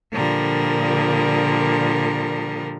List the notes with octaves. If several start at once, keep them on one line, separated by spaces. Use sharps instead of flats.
A#2 D3 F3 G3 A#4